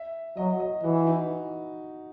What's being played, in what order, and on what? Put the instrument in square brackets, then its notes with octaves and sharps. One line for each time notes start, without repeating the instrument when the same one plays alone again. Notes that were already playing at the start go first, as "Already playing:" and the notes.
Already playing: [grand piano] E5
[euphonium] F#3 [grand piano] D#5
[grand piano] D#5
[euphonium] E3 [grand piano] F#4
[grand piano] D#4